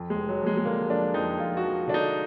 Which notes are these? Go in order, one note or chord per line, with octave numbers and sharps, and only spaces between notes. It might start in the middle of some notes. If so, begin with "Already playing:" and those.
Already playing: F2
G#3
F1
F#3
F2
G#3
G#3
D3 A#3
F3 D4
F2 D#4
F2 F4
F#4
F3
D3 D4
D#4